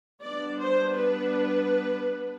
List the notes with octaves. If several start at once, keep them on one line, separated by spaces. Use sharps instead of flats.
G3 B3 D4 D5
C5
B4